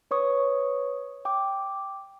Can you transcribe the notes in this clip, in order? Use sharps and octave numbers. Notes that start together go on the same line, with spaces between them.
B4 C#5 C#6 D#6
G5 D6